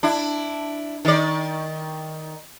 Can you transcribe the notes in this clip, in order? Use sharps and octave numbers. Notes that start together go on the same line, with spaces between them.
D4 E4
D#3 D5